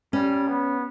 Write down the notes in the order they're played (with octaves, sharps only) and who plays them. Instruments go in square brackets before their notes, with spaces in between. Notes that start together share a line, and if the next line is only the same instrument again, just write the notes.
[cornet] G3 [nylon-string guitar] C#4
[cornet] B3